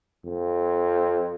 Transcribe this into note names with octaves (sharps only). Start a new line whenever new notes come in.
F2